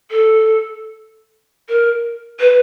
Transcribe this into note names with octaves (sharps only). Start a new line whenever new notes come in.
A4
A#4
B4